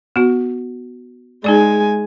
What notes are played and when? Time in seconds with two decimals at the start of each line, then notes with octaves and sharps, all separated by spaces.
0.16 B3 F#4
1.44 G#3 D#4 G#4 D5 G#5